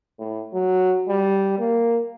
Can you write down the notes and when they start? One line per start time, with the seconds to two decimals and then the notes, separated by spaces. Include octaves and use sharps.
0.19 A2
0.54 F#3
1.08 G3
1.59 A#3